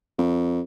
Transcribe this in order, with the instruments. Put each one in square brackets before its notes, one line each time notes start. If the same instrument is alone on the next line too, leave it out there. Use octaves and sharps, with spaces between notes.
[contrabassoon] F2